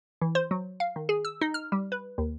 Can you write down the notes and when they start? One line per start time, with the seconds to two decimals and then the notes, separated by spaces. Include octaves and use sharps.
0.21 E3
0.35 C5
0.51 F#3
0.80 F5
0.96 D#3
1.09 G#4
1.25 E6
1.41 D#4
1.54 F6
1.72 G3
1.92 B4
2.18 D#2